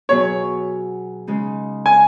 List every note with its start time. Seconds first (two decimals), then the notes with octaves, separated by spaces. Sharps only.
0.09 B2 F#3 B3 G#4 C#5
1.27 C#3 G#3 D#4
1.86 G#5